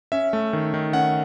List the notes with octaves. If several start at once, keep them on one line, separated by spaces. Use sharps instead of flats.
C#4 E5
A3
D#3
D#3
C#4 F#5